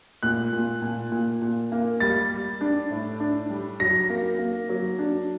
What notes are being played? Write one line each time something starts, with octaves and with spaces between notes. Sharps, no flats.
A#2 F#6
A#2
A#2
A#2
A#2
A#3
G3 A6
G3
D4
A2
D4
G3
F#3 A#6
A#3
A#3
F#3
D4